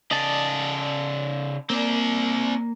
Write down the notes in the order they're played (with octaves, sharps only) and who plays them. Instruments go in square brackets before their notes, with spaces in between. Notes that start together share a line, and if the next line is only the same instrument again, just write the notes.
[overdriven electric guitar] C#3 D5 [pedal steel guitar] D#5 A5
[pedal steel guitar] A#3 [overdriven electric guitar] C4 D5